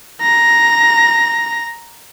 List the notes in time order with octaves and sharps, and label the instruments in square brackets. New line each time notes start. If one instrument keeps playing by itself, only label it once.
[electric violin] A#5 A#6